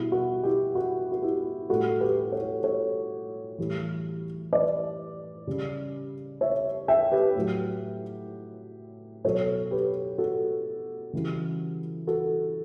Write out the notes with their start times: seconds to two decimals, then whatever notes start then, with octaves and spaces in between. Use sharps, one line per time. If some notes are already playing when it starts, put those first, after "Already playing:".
Already playing: B2 G3 E4
0.12 F#4
0.43 E4 G4
0.75 F#4
1.12 F#4
1.22 E4 G4
1.69 A2 G3 F#4 A4
2.00 G4 B4
2.32 A4 C#5
2.63 A4 C#5
3.58 A2 E3 G3
4.53 B4 D5
5.47 C#3 G3
6.41 C#5 E5
6.88 E5 G5
7.12 G4 B4
7.36 A2 F#3
9.24 B2 F#3 A4 C#5
9.71 G4 B4
10.18 F#4 A4
11.13 C#3 E3 G3
12.07 F#4 A4